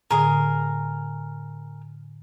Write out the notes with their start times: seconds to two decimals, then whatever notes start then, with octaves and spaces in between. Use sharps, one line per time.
0.11 A2 D3 G#4 A#4 D#6